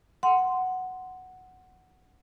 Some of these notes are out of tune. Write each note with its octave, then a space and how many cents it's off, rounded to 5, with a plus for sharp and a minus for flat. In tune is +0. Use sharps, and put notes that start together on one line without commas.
F#5 +0 C6 -10